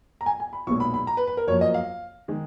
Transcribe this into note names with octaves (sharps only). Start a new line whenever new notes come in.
A#5
G#5
G#5
B5
B1 A#2 G#3 C#6
B5
B5
A#5
B4
B4
A#4
F#2 F3 A#3 C#5
D#5
F5
D#3 G#3